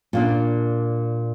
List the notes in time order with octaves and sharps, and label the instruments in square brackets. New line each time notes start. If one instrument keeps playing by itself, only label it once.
[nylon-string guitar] A#2 A#3 D4